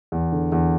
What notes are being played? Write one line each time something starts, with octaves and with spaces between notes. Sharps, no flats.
E2
D3
E2